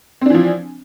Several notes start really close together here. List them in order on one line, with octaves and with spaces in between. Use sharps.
C4 D4 E3 F3